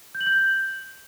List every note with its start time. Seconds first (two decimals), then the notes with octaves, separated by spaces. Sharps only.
0.15 G6
0.21 F#7
0.27 G6